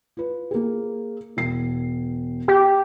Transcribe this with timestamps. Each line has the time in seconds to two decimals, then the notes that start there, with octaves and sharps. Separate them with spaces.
0.17 F4 B4
0.51 A#3 G#4
1.37 E1 C7
2.48 G4